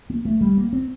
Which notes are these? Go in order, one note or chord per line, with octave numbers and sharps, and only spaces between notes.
A#3
A3
G3
A#3
C4